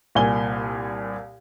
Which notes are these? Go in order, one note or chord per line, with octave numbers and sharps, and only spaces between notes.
C2 A#2 G#5 G7